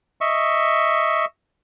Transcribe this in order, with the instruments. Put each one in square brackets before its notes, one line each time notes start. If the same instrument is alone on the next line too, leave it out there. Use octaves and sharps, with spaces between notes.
[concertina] D#5 E5 C#6